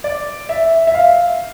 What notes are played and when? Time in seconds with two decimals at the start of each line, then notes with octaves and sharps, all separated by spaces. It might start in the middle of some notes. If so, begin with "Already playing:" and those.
0.04 D5
0.49 E5
0.87 E5
0.94 F5